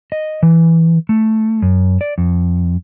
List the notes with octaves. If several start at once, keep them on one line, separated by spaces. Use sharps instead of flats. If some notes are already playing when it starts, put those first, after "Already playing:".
D#5
E3
A3
F#2
D5
F2